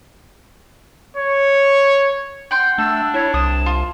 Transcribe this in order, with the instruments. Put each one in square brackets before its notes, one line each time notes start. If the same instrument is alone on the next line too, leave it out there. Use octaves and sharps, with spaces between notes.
[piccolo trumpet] C#5
[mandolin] F#5 G5 C6
[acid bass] A3 [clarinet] D4 [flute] E6
[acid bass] E4 [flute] C#5
[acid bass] C2 [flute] A5 [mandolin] D#6
[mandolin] F4